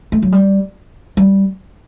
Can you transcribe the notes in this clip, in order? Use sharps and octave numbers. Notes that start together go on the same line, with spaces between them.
A3
F#3
G3
G3